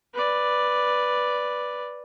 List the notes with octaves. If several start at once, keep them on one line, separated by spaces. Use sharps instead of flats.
B4 D5